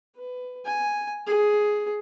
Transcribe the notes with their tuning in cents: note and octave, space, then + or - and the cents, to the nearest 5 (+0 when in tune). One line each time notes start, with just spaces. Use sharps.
B4 +20
G#5 +0
G#4 +10